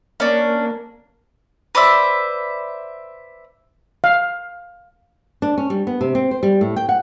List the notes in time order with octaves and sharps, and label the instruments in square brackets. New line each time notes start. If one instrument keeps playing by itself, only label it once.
[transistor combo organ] A#3 [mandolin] C#4 D4
[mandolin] B4 C5 D5 E5
[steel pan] F5
[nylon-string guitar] D4
C#4
G3
B3
C3
C4
C5
G3
A2
G5
F#5